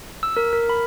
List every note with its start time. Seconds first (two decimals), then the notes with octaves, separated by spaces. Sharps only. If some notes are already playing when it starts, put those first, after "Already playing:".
0.23 E6
0.37 A#4
0.53 A#4
0.69 B5